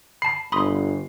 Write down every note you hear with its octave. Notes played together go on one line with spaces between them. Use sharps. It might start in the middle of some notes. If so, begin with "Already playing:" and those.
A5 B5 C7
G1 B5 C6 D#6